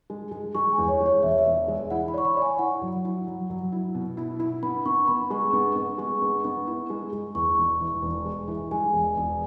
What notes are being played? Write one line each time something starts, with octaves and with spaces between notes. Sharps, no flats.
G#3
G#3
G#3 C#6
G#5
E2
C#5
G#3
C#5
E1 E5
C#5
E5
E1
G#3
E4 F#5
B5
C#5 C#6
B5
C#5
G#5
E4 F#5
F#3
E4
F#3
F#3
E4
B2
E4
E4
B3 B5
B3 C#6
B3 B5
G#3 C#6
B3
B3
G#3 C#6
B3
B3
E4
G#3
G#3
E2 C#6
E1
E3
E1
G#3
E3
G#3 G#5
E1
E1